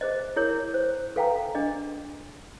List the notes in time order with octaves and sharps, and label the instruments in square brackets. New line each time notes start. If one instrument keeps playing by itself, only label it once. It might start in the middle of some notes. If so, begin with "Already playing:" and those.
[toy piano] G#4 C5 D#5
E4 G#4 A#4 C#5
C5
A4 B4 F5 G5 G#5 A#5
D4 G#4 D#5